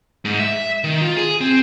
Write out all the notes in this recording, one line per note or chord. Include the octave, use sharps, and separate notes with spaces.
G#2
E5
D#3
F4
G#4
C4